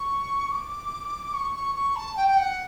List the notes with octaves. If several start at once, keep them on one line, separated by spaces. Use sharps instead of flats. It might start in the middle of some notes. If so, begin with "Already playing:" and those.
Already playing: C#6
D6
C#6
C#6
C#6
A5
G5
G5
F#5